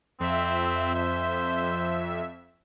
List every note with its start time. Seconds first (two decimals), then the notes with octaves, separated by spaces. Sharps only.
0.20 F2 C4 E5
0.95 C5